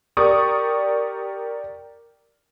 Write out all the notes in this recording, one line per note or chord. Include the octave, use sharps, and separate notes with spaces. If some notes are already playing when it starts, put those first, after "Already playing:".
G4 A#4 D5 C#6 D#6